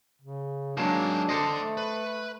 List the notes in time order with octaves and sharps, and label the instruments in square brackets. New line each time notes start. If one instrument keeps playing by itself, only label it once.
[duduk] C#3
[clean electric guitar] F#3 G#3 A#3 [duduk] D4 [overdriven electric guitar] D#4 A5
[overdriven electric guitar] D3 D5 [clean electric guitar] A4 C5 D#5
[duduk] A3
[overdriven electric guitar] B4